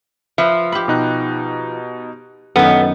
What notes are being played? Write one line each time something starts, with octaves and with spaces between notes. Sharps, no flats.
F3 B4 E5
G4 B5
B2 D#4 F#6
F#2 D#3 B3 A4 B4 F#5